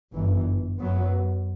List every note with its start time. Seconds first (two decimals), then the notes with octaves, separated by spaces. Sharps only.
0.13 G1 F#2 E3
0.80 F#2 F#3 B3